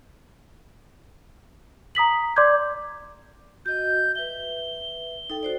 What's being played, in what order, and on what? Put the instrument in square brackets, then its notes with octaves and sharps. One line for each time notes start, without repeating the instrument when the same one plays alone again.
[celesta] A#5 D#6 B6 F#7
D5 C6 D6 G6 G#6
[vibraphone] F#4 D#5 [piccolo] G6
[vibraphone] B4 E5 [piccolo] G7
[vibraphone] D#4 A4 G5
F#4 C5 D5